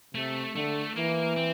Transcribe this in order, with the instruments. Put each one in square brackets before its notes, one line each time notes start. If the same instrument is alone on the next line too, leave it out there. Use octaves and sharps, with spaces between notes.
[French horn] C3 [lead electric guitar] A3
[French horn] D3 [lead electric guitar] A3
[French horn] E3 [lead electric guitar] A#3
[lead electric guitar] C4